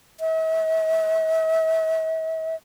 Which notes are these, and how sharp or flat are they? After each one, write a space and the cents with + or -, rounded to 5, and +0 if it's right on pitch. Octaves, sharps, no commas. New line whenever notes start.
E5 -45